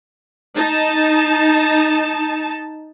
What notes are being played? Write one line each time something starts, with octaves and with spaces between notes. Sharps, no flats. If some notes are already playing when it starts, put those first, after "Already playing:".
D#4 A5